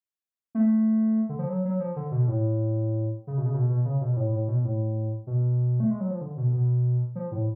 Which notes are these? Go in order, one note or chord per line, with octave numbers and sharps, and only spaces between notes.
A3
D3
F3
F#3
F#3
F3
D3
B2
A2
C#3
B2
C#3
B2
B2
C#3
B2
B2
A2
A2
B2
A2
B2
A3
G#3
F#3
F3
D3
B2
B2
F3
A2